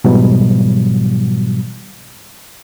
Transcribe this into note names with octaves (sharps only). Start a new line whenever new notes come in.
G#2 B2 E3 F#3 G3